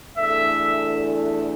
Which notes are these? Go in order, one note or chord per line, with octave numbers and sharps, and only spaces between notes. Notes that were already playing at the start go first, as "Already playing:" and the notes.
E2 E3 A3 D4 A4 E5